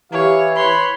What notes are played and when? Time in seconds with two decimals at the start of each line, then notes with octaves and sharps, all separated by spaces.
0.12 E3 G4 C#5 F5
0.55 B4 C#5 B5 C6